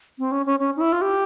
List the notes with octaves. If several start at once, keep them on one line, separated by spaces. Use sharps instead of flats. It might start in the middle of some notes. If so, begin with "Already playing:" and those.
C4
C#4
C#4
C#4
D#4
E4
F4
G4